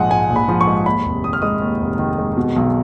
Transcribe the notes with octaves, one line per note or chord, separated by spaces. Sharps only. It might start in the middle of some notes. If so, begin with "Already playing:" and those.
Already playing: A#1 G#2 F3 G#3 F#5 G#5
G#2 G#5
A#1
B5
F3
C#6
G#3
D#2 B5
F1
D#3 D#6
F6
G#3 D#6
D#2
F1
D#3
G#3
B2
B1